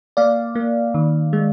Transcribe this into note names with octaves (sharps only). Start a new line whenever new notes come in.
A#3 D5 F5
A#3
D#3
G#3